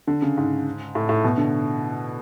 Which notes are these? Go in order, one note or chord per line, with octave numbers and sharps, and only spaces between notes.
D3
C#3
G#2
A2
A2
B2
D3